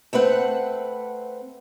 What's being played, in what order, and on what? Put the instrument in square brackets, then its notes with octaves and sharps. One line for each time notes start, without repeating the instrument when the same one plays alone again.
[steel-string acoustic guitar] A3 C4 B4 F#5